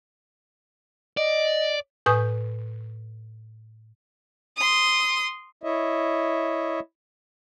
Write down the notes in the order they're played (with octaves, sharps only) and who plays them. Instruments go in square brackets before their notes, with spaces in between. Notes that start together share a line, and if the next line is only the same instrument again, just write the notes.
[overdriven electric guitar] D5 [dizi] D#5
[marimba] A2 B4 G#5 D#6 G6
[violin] C6 D#6
[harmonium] E4 C#5 D#5 E5